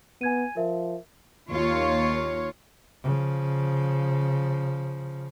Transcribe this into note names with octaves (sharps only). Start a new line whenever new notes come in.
B3 G#5 G#6 D#7
F3 A#4 E5
D#2 F4 C#5
C#3 F3